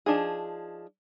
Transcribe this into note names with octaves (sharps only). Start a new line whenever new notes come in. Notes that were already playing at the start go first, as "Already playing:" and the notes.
F3 D4 D#4 G#4